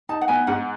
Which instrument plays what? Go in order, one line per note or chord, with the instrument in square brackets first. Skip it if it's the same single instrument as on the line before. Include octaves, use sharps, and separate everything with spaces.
[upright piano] D#4 [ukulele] A5
[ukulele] F#5
[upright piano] B3 [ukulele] G#5
[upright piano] G#2 [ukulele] F#5